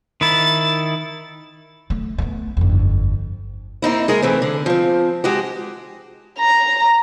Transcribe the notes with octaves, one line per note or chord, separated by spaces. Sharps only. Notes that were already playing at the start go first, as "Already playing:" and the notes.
D#3 E4 A6
A3
A3 B3
G1 F2
A#3 C4 D#4 E4
G#3 G#4 A#4
E3 A3 C4
D3
F3 C4
G#3 F#4 G4
A#5